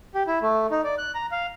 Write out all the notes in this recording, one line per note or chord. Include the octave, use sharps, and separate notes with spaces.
G4
E4
A3
D#4
D5
F#6
A#5
F5